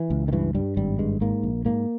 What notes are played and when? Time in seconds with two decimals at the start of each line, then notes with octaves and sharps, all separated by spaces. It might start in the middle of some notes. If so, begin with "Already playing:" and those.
Already playing: E3
0.10 C#2
0.28 D#3
0.32 G2 E3
0.55 G2 G3
0.77 G#1 G3
0.99 G2 G#3
1.21 G#2 A#3
1.43 A#1
1.65 G#2 A#3